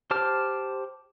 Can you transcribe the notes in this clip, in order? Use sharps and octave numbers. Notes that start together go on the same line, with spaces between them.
G4 C5 A5 D6 F6